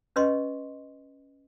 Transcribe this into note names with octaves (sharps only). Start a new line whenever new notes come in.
C#4 B4 D#5 C6 C#6